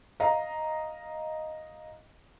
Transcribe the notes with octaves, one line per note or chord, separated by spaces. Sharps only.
D#5 F5 A#5